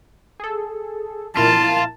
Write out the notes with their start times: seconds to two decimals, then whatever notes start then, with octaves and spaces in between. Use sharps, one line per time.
0.40 G#4 A4
1.37 A#2 E4 F4 A#4 A5